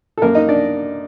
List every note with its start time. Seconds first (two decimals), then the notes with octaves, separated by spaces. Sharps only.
0.18 A4
0.22 F#2 A#3 A#4
0.35 D#4 D#5
0.48 D4 D5